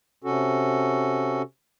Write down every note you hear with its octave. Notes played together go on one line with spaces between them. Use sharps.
C3 C#4 F#4 A4